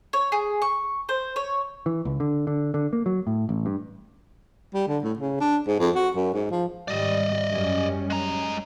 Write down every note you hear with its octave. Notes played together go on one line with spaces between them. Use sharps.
C#5
G#4
C#6
C5
C#5
E3
C#2
D3
D3
D3
A#3
F#3
A2
A1
G2
G3
D3
A2
C#3
D4
G#2
F2
F#4
F#2
G#2
F3
G#1 G3 D5 D#5
F#2 G3 C#4
G#3 A#5